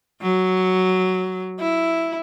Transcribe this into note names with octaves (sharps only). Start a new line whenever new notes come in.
F#3
E4